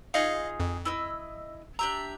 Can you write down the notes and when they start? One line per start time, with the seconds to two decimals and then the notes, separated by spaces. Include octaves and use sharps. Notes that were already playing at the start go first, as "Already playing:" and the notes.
0.14 D#4 F4 G#4 D#5 F5
0.60 F2
0.85 E4 D#5 E6
1.79 D4 G4 E5 A#5